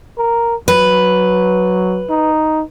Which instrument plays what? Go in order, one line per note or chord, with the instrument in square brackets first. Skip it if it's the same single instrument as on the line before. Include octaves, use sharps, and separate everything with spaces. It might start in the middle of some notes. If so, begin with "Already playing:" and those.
[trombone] A#4
[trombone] F#3 [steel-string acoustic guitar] B4
[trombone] D#4